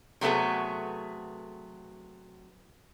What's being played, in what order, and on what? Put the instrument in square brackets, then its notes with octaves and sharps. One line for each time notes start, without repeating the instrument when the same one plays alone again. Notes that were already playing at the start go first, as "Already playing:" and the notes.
[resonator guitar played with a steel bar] C3 F#3 A3 B3 G#4